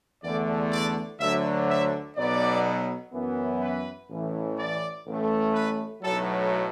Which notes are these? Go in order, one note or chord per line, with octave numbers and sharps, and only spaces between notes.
E2 D3 A3 D5
D5
D2 D3 F#3 E5
E5
B1 B2 F#3 B3 D5
F#2 E3 B3
B4
A1 A2 E3
D5
A1 A2 A3
B4
B1 A2 F#3 A4